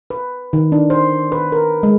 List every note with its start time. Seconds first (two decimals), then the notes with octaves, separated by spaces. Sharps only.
0.10 B4
0.53 D#3
0.72 D4
0.90 C5
1.32 B4
1.52 A#4
1.83 G#3